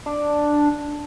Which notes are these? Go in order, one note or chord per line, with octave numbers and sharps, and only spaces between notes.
D4